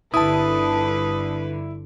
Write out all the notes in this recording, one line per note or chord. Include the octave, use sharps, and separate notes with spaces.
G1 D3 E4 B4 A5 D#6